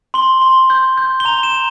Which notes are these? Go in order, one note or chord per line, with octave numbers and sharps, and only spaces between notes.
C6 G7
C6
G6
G6
G7
A#5 F7
E7
A#5